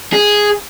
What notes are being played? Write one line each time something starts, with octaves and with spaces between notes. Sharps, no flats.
G#4